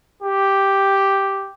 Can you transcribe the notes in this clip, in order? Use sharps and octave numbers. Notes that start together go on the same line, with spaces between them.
G4